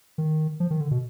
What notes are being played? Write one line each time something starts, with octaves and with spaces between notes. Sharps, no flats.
D#3
F3
D#3
D3
B2